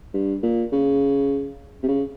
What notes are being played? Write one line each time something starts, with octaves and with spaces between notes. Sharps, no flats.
G2
A#2
C#3
C3
C#3